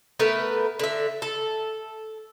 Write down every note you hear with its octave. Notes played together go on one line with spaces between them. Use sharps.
A3 B3 A#4 B4
D3 E5
A4